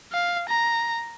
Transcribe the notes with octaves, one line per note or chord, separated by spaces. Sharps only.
F5
A#5